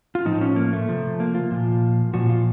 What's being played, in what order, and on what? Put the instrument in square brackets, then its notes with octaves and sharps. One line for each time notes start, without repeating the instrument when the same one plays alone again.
[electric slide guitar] F4
A2 F3 D#4
C#4
A#3
A3
C3 F3
A#3
F4
A#2 F3
A#2 F3 F#4
F4